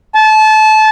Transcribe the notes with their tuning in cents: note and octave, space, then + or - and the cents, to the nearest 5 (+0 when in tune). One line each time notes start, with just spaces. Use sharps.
A5 -25